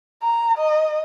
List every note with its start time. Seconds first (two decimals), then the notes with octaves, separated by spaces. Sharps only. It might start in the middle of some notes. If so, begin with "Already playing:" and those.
0.22 A#5
0.58 D#5